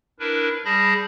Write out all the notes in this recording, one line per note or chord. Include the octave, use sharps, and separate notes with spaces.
D4 E4 A#4 B4
G3 G#4 A5 B5 G6 A#6